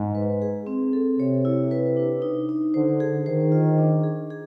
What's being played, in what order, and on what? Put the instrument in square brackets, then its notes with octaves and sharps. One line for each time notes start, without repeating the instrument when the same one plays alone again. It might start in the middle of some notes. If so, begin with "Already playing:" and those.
Already playing: [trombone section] G#2
[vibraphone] B4
G#4
C4
A4
[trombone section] C3 [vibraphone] C#5
[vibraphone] E4
B4
D4
D#4
D#4
[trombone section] D3 [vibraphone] C5
[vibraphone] G#4
[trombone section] D#3 [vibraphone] C5
[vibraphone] F4
D4
G#4
G#4